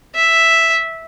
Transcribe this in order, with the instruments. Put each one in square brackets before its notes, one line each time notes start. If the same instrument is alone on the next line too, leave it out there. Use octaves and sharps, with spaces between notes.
[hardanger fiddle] E5